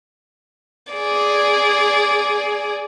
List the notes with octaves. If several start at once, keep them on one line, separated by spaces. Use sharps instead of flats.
G#4 D5